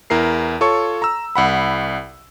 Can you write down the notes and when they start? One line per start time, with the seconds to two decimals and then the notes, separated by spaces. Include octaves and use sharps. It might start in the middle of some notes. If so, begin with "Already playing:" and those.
0.10 E2 E4 A#4 C7
0.61 F4 A4 C#5 C#6
1.02 A#5 E6
1.36 C2 F#5 B5